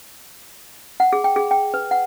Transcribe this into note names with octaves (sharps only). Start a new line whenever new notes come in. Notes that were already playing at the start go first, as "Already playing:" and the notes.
F#5
G#4
G5
G#4
G5
B4
F#5